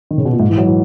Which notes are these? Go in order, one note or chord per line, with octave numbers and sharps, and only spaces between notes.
D#3
C#3
B2
A#2
G#2
E3
F#3
E3